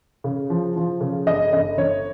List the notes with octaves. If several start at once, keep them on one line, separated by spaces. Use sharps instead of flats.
C#3
F3
F3
C#3
G1 D#5
G1 D#5
G1 C#5